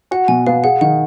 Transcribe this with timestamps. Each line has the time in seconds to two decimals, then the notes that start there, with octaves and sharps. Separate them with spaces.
0.11 F#4 F#5
0.28 B2 G#5
0.47 B3 F5
0.64 G#4 F#5
0.81 D#3 F#5